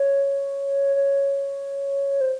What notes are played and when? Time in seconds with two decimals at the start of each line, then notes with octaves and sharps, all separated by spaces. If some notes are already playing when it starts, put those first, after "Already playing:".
Already playing: C#5
0.96 C#5
2.21 C5